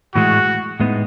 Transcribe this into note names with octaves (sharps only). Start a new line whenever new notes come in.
A2 E3 G#3 F#4
A2 G#3 B3 D#4